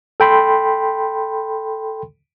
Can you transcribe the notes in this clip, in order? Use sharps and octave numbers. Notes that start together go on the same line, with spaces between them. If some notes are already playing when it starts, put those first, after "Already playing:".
A4 G5 B5 C6